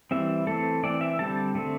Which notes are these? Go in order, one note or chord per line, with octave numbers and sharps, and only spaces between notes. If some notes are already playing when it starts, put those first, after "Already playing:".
E3 G3 C4 E5
E3 A3 C4 A4
E3 C4 D5
E5
D3 G3 C4 A5
D3 A3 C4